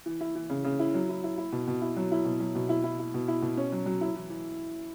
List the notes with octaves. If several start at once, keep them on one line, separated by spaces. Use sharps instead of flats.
E3
E4
E3
C#3
C#3
E4
F#3
E4
E4
E4
B2
B2
E4
F#3
E4
B2
F#3
B2
E4
E4
E4
B2
E4
B2
C#4
F#3
F#3
E4
E3
E3